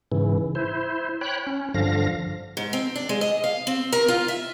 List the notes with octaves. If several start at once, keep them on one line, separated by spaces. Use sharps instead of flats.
G#2 C#3 E3
E4 C5
C#5 G5 B5 F#6
C#4
G2 D3 F3 F5 A#6
G#2
C4
D4
G#3
D#5
F5
C4
A#4
F4
E5